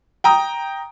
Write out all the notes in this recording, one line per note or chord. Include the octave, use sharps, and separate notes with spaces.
G5 A#5 D#6